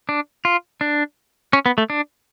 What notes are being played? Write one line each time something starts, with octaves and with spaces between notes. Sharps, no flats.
D4
F4
D4
C#4
B3
A3
D4